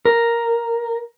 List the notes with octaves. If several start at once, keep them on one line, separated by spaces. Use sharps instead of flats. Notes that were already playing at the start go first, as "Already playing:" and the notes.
A#4